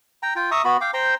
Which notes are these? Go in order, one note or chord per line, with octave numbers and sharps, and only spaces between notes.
G5 A#5
F4 G5
E5 A#5 C#6 D#6
B3 F#4 B5
F5 G5 D6
C5 G5 A#5 C6